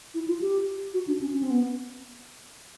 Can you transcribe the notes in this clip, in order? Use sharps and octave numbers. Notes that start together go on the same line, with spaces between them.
E4
F4
G4
F#4
D4
C#4
C#4
C4
B3